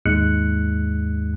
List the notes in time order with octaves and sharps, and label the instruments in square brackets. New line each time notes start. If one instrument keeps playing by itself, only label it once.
[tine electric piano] D#2 G#2 G#3 F#6 C#7